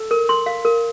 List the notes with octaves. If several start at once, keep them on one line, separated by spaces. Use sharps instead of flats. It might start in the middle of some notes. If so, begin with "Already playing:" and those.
Already playing: A4
A#4
C6
F5
A#4